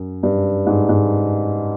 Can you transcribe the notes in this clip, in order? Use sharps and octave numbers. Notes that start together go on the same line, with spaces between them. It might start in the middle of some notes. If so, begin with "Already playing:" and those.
Already playing: F#2
G2
G#2
G#2